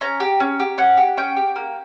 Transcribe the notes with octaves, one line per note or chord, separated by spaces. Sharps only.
C#4 A#5
G4
C#4
G4
C#4 F#5
G4
C#4 G5
G4
A#3